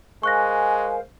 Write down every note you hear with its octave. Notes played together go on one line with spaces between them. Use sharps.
G#3 A#4 C5 F5 G#5 C#6 F#6 A#6